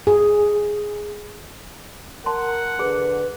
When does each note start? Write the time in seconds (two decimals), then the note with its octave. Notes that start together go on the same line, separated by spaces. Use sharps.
0.07 G#4
2.26 A#4 F#5 A5 C6
2.79 D3 G#4 B4